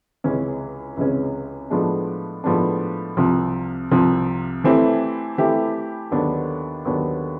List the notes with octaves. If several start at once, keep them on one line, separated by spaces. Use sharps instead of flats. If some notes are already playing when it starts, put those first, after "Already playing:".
C#2 C3 E3 G#3 C#4
C#2 C3 E3 G#3 C#4
A2 F3 G#3 B3 D4
A2 F3 G#3 B3 D4
C2 C3 F3
C2 C3 F3
E3 A3 C4 E4 G4
E3 A3 C4 E4 G4
D#2 D3 F#3 B3 D4
D#2 D3 F#3 B3 D4